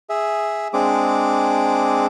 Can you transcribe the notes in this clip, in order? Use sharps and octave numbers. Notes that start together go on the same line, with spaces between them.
G#4 E5
G#3 C4 D4 G#4 D6